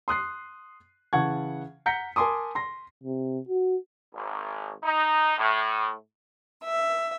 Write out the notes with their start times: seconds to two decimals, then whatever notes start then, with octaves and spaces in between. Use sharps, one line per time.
0.08 C6 D#6 F#6 C7
1.13 C#3 E3 F#5 A5 C#6 G#6
1.86 F#5 A#5 G6 A#6 B6 C#7
2.16 A#4 G#5 A5 C6 D6 D#6
2.55 C6 A#6
3.04 C3
3.48 F#4
4.14 G#1
4.83 D#4
5.37 A2
6.65 E5